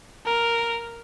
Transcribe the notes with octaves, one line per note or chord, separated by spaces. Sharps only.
A#4